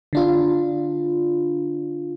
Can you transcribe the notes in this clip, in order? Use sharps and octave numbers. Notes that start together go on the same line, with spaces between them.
D3 D4 F4